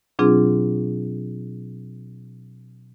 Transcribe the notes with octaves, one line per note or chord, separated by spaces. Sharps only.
B2 F#3 C4 D4 F4 G#4